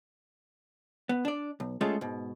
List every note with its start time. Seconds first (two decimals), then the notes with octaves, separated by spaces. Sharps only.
1.09 B3
1.25 D4 D5
1.60 B1
1.81 G#3 A3 C#4 F4 G#4 A4
2.01 G#2 B2